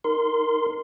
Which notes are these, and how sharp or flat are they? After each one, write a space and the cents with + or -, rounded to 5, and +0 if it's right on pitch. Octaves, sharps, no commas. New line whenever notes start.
D#4 -5 A#4 +0 C6 -15